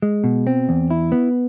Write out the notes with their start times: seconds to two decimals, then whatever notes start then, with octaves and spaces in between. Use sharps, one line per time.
0.02 G#3
0.24 B2
0.47 C4
0.69 E2
0.90 E4
1.12 B3